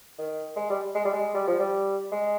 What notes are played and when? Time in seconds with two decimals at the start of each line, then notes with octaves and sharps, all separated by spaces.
0.19 D#3
0.56 G#3
0.70 G3
0.95 G#3
1.05 G3
1.13 G#3
1.34 G3
1.48 F3
1.60 G3
2.12 G#3